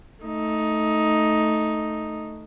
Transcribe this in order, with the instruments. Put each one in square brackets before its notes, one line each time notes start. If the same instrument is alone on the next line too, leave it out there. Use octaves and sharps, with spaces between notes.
[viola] A3 D#4